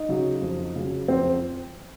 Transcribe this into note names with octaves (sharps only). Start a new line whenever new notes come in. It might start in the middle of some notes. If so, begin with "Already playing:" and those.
Already playing: D#4
C#3 F#3
F2
C#3 F#3
F2 C4